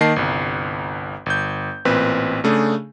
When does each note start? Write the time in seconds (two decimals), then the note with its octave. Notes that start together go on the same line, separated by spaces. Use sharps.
0.01 D#3 A#3 D#5 A5 C7
0.16 G1 C2
1.26 G1 G6
1.85 A1 A#2 C4 B4
2.44 C#3 A3 D4 G#4